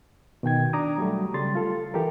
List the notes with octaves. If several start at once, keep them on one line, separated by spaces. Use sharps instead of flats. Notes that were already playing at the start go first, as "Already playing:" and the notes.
B2 D#3 G5 G#6
D4 A#5 D6 D#6
F#3 G3 A3
C#3 G3 A3 C6 A6
F4 A4
E3 G4 A4 A#4